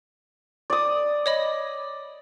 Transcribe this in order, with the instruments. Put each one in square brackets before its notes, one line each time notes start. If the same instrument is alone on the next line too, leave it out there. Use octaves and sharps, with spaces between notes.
[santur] D5 D#6
[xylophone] C#5 D#5 B5